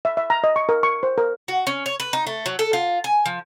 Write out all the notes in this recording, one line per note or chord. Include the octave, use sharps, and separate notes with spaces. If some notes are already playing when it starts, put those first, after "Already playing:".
E5
E5
A#5
D#5
C#6
A#4
C#6
C5
A#4
F#4
C#4
C#5
B4
D#4
A3
F#3
A4
F4
G#5
F3